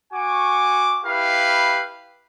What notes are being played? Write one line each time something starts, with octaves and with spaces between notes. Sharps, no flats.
F#4 G#5 C#6 D6
E4 G4 B4 F5